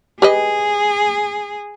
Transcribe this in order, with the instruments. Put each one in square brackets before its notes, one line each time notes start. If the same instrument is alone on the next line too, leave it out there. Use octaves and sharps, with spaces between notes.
[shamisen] G4 B4 D#5 [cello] G#4